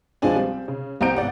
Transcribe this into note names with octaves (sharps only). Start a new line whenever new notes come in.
C#2 F3 G#3 C4 D4 G#5
G3 C4
C#3
C2 C4 A#5 G6 D7
G#1 B3 D5 F#5